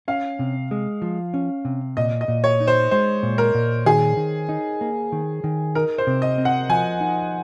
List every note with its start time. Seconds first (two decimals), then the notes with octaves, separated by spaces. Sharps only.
0.08 C#4 F5
0.39 C3
0.71 G#3
1.02 F3
1.34 C#4
1.65 C3
1.97 A#2 D#5
2.21 D#5
2.28 A#2
2.44 C#5
2.60 D#4
2.67 C5
2.91 G#3 C5
3.23 A#2
3.38 A#4
3.54 A#2
3.86 D#3 G#4
4.17 D#3
4.49 D#4
4.81 A#3
5.12 D#3
5.44 D#3
5.75 D#4 A#4
5.98 C5
6.07 C3
6.22 D#5
6.38 C4
6.45 F#5
6.69 F3 G#5
7.01 D#4